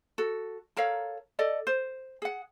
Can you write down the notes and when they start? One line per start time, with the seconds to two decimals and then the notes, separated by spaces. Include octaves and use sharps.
0.18 F#4 A4
0.77 A4 A#4 C#5 F5
1.39 A4 D5 D#5
1.67 C5
2.22 G#4 F#5